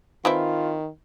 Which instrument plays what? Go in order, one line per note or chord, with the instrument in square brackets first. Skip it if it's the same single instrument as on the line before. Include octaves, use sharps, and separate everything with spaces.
[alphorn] D#3 [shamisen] E3 C4 E4 [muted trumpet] F4